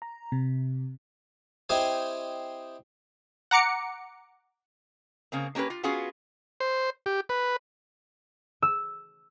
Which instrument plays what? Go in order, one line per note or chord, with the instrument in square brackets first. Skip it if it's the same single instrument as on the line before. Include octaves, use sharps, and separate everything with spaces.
[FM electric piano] A#5
C3
[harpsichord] C4 E4 G4 C5 D#5 G#5
[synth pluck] F#5 A#5 D6 C#7
[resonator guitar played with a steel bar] C#3 A#3 C4
A#3 C#4 G4 A#4 B4
F4
B3 C#4 F4 F#4 G#4
[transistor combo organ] C5
G4
B4
[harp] E6